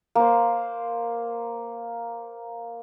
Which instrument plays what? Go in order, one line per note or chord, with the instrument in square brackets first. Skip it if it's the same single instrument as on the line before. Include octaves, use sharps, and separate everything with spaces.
[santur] A#3 C5